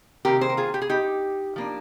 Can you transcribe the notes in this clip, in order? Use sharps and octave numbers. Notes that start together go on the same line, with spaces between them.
C3 D#3 A#3 G4 A#4
G#4 C5
A#4
F4 G#4
G4
G#4
D#4 G4
F3 A#3 D4